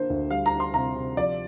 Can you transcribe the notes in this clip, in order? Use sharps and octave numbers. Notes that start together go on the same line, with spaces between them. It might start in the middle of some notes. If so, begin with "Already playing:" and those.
Already playing: D3 A#3 D4 C5
D2
G3 F5
A#5
D4
C6
C3 A#5
C3
F3 D5